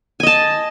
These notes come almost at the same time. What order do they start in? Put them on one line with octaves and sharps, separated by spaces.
G#5 D#5 A5